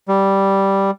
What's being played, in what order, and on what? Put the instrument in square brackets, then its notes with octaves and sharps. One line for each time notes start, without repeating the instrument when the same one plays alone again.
[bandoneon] G3